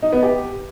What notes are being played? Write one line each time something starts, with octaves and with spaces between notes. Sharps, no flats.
D#4
B3
G4